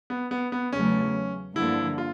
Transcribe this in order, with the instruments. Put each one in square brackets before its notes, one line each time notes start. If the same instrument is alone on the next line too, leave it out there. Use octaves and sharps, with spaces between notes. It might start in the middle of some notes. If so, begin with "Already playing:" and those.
[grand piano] B3
B3
B3
[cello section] E2 C#3 F#3 A3 [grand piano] C#4
[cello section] G2 D3 F3 A#3 [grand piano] E4
[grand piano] F4